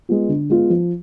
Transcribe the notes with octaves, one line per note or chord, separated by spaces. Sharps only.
G#3 B3 F4
D3
G#3 B3 F4
F3